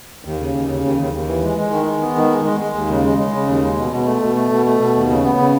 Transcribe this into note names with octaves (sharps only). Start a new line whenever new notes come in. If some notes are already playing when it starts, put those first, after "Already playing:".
D#2
C#3
D#2
C#3
D#2
D#2
D#2
E3
G#3
G#3
D#3
G#3
B3
D#3
G#3
G#3
G#3
D#2
C#3
G#3
G#3
C#3
D#2
G#3
B2
B2
A3
B2
A3
B2
A3
B2
D#2
C#3
B3
C#3